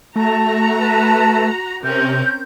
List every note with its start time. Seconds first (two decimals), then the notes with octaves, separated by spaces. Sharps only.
0.16 A3 F#4 A5 A#5
0.77 B4 A5
1.83 C3 C4 C#4 A#4 G6